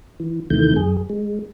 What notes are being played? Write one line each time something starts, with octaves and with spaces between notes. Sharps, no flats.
E3
D#2 C3 D#3 E3 A3 G6
F#2 G#4
G#3